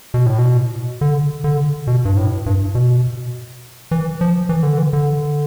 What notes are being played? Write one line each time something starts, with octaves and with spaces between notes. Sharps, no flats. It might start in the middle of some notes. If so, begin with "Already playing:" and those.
B2
A2
B2
D3
D3
B2
G2
A2
G2
B2
E3
F3
E3
D3
E3
D3